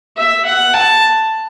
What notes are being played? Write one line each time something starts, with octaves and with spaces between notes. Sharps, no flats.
E5
F#5
A5